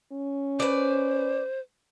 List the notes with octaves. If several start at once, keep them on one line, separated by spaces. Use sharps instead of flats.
C#4
B4 C5 D5